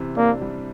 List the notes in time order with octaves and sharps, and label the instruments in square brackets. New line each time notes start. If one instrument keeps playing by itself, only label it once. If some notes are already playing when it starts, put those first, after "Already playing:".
Already playing: [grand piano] C3 E3
[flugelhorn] A#3 [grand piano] D4
[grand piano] G3